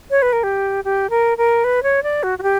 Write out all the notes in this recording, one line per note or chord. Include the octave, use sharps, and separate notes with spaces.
C#5
B4
A#4
G4
G4
A#4
A#4
B4
C#5
D5
F#4
F#4
G4